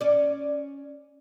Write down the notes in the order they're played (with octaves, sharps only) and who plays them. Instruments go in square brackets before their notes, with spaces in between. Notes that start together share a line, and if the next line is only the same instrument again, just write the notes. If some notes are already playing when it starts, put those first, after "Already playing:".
[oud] C#4 D5